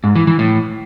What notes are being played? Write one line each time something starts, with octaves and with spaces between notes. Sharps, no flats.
G#2
E3
E3
A2